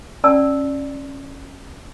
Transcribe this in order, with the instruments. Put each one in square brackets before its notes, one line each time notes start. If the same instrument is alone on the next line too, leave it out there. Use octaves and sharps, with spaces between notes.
[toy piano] C#4 D5 A5 E6